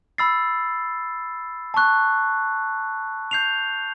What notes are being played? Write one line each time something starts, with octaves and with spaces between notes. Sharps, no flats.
B5 E6 A6 C7
A5 C#6 F#6
G6 C7 F7